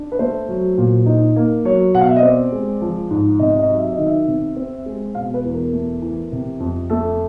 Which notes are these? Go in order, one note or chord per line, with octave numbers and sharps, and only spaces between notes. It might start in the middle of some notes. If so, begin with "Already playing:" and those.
Already playing: D4
B4
A3 C5
F#3
A#2
D#4
A#3
F#3 C#5
B2 F#5
F5
E5
D#5
C4 D5
G#3
F3
G#2
C3 D#5
D#5
F#3
E5
D#5
D#3
E5
C3
C4
G#3
B2 F5
B4
E2
A#4
A3
E3
C3
F2
A3 A4